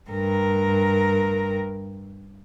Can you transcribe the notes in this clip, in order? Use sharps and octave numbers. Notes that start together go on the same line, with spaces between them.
G2 A#4